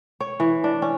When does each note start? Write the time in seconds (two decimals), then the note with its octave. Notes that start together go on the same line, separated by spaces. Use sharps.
0.20 C#5
0.40 E3
0.64 D4
0.82 C#4